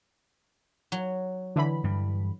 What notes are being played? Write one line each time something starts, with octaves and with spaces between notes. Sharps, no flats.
F#3
D3 E3 B5
G2 G3